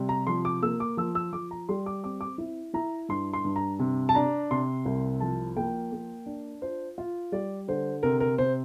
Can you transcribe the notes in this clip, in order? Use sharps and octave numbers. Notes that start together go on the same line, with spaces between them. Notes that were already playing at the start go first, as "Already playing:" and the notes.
Already playing: C3 G3
A#5
F3 C6
D6
A#3 E6
D6
F3 E6
E6
F3 D6
A#5
G3 C6
D6
C4 D6
D6
E4
E4 A#5
G2 C6
C6
G2
A#5
C3
A5
D4 A#5
C3 C6
C2
F3 A5
A#3 G5
A#3
D4
F4 C5
F4
G3 D5
D3 C5
C3 A#4
A#4
C3 C5